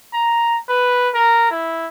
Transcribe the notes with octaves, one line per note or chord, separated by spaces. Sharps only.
A#5
B4
A#4
E4